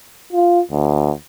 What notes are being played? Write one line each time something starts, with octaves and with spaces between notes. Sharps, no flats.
F4
D2